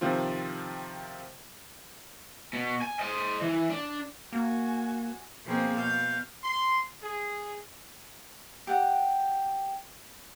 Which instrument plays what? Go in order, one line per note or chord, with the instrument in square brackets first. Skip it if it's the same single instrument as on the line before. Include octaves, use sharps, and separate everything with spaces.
[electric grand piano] C3 D#3 F3 C4 F4
[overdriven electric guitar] B2
G#5
C5 D#5
E3
D4
[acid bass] A#3 [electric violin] F#4 G#5
[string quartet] B2 F3 A#3 C4 G#4
B2 F5 G6
[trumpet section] C6
G#4
[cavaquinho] G4 F#5